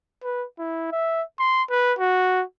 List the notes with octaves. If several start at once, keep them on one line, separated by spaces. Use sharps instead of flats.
B4
E4
E5
C6
B4
F#4